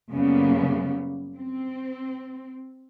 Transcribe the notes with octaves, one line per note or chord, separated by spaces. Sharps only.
F#2 C#3 G3 A#3 B3
C4